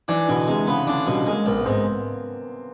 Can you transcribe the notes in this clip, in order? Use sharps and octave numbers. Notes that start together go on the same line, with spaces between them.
E3 D4
B2 D3
C3 G#3
C#3 B3
D3 D4
B2 G3
G#3 A#3
A#1 B3
G#2 C4